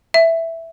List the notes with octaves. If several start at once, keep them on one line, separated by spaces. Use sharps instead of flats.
E5